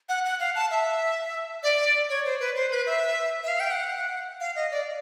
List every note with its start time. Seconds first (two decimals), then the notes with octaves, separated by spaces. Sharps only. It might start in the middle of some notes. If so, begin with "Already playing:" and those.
0.09 F#5
0.25 F#5
0.40 F5
0.55 A5
0.71 E5
1.63 D5
2.10 C#5
2.25 C5
2.40 B4
2.56 C5
2.71 B4
2.86 E5
3.43 E5
3.48 F5
3.60 G5
3.71 F#5
4.40 F5
4.56 D#5
4.71 D5